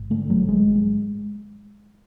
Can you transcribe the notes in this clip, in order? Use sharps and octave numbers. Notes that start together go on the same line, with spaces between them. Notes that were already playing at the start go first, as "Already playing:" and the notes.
Already playing: G#1
D3 A3
G#1 F#3
G#1 G#3
G#1
G#3